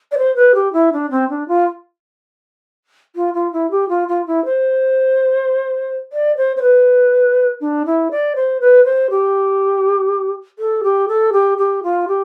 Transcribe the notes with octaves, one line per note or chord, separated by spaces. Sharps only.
D5
C5
B4
G4
E4
D4
C4
D4
F4
F4
F4
E4
G4
F4
F4
E4
C5
D5
C5
C5
B4
D4
E4
D5
C5
B4
C5
G4
A4
G4
A4
G4
G4
F4
G4